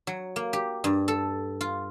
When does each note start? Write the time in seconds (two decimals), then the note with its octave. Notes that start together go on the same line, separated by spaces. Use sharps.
0.07 F#3
0.36 A#3
0.53 G4
0.84 G2
1.08 A4
1.61 F4